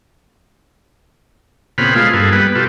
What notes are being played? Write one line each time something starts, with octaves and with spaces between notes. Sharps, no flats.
A#2 C#3 B3 C4 B5 F6
G#3 A3 F4 F5
G2 A#3 G#4 A4 B4
G3 B3 B4
B2 F4 G4 A4